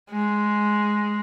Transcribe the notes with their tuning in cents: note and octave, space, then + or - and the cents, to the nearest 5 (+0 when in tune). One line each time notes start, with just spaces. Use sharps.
G#3 +5